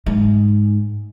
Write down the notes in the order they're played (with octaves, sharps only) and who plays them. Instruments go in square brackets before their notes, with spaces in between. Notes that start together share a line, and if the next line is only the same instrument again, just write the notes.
[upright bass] G#2